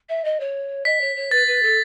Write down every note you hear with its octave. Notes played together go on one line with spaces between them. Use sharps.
E5
D#5
C#5
D#5 B6
C#5
C#5
B4 A6
B4
A4